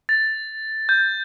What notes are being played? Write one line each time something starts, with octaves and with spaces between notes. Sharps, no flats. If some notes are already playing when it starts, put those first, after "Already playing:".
A6
G6